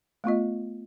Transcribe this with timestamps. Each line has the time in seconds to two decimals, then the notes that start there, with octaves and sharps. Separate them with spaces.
0.24 A3 B3 F4 D#5